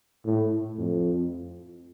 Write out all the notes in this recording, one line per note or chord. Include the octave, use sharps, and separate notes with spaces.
A2
F2